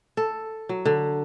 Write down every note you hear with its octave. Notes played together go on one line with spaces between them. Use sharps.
A4
F#3
D3